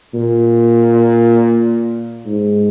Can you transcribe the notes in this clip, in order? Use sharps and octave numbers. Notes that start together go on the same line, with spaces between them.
A#2
G#2